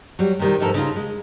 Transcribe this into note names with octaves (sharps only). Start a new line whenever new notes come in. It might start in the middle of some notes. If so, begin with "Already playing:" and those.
F#3 G3
C3 D#3 G3
G#2 C3 F3 A4 A#4
C#3 D#4 F4
G#3